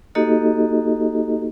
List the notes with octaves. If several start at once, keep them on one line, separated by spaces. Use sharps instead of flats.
A#3 D#4 F#4 G4 A4 D#5